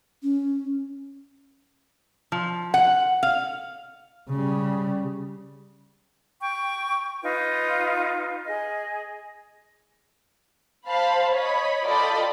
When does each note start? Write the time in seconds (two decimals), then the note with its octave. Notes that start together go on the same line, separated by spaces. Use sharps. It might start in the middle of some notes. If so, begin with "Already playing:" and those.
0.23 C#4
2.32 F3
2.74 F#5
3.23 F5
4.30 C#3 G3
6.42 G5 C#6
7.22 D#4 F4 B4
8.47 G#4 D#5
10.88 C5 F5 A5 B5
11.34 C#5 D#5 B5
11.85 F4 A4 D5 D#5 G5 B5